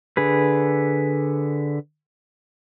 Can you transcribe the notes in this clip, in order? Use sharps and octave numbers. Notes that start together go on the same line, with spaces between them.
D3 G#4 B4